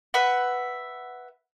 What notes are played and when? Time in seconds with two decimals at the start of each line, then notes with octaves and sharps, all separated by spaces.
0.14 B4 E5 F#5